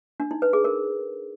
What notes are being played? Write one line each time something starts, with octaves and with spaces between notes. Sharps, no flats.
D4
D#4
B4
G#4
A#4